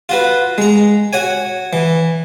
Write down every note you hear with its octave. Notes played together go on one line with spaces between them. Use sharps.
F4 F#4 B4
G#3 A#5
F#4 C#5 G#5
E3